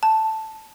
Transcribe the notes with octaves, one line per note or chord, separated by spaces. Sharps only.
A5